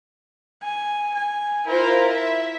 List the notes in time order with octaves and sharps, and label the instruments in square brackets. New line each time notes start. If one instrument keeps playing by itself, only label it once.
[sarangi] G#5
G#5
[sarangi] E4 [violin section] F4 A#4 C5
[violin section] E5